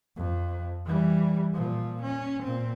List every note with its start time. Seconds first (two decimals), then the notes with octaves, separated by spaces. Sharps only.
0.16 F2
0.85 E3 G3
1.53 A#2 F3
2.02 C#4
2.43 A#2 C4